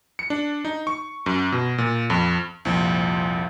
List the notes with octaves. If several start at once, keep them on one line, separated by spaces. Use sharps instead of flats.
C#7
D4
D#4
C#6
F#2
B2
A#2
F2
C2 F2 A#2 F3